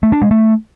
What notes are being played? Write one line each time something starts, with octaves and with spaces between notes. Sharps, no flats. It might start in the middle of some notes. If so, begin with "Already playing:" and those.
A3
D4
G#3
A3